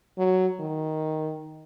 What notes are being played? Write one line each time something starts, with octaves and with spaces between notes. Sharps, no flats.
F#3
D#3